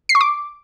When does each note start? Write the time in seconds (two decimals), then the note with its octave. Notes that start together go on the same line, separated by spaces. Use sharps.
0.09 C7
0.15 C#6
0.21 D6